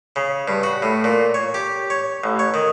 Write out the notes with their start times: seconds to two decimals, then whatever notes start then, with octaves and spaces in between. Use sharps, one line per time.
0.16 C#3
0.48 G2
0.63 F#4
0.82 A2
1.04 A#2
1.34 C#5
1.54 G4
1.90 C#5
2.24 A1
2.39 C#5
2.54 D#3